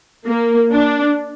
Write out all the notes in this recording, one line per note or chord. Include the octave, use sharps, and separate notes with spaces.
A#3
D4